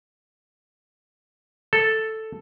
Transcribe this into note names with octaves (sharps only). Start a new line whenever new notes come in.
A4